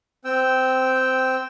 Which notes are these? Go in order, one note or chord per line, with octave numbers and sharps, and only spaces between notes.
C4 G5 E6